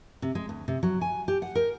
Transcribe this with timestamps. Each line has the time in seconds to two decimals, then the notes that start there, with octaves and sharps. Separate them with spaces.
0.22 C3
0.35 G#3
0.49 D2
0.68 C3
0.83 F#3
1.01 G#5
1.28 G4
1.42 F#5
1.55 A#4